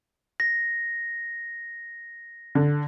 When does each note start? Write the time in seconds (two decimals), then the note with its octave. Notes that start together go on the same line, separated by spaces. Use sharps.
0.40 A#6
2.55 D3